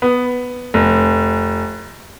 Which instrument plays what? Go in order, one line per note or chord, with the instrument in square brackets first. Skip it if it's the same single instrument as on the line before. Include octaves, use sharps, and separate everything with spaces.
[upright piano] B3
F1